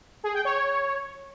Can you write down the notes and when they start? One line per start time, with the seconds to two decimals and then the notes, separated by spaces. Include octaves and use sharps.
0.24 G#4
0.34 G5
0.45 C#5